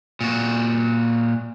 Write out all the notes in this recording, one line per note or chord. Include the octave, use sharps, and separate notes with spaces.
A#2 F#4